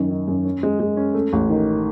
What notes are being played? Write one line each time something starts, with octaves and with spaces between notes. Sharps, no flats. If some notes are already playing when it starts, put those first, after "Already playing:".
Already playing: F#2 D#3
D#3
F#2
C#4
G#3
G#3
C#4
A3
A1
D#3